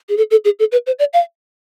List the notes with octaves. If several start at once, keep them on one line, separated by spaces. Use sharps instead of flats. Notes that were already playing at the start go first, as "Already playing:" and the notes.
G#4
A4
A4
G#4
A4
B4
C5
D5
F5